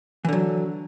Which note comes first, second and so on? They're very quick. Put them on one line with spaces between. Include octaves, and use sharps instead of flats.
E3 D3 F#3